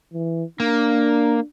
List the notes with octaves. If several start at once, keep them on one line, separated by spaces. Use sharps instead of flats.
E3
A#3 D4